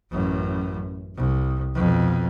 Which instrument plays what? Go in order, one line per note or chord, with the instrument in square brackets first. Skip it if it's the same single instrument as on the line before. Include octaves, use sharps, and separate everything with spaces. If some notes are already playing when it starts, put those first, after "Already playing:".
[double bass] A1 F#2
C2
F2 B2